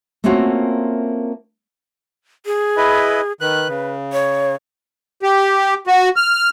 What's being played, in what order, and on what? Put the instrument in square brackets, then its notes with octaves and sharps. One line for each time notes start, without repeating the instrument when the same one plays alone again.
[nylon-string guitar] A3 A#3 C4 C#4 F4 F#4
[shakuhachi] G#4
[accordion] E4 B4 D#5
[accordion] D#3 F#6 [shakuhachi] B4
[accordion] C#3
[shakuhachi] C#5
[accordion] G4
F#4
F6